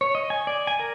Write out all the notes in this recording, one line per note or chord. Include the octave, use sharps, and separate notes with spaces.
C#5
D#5
G#5
D5
G#5
A#4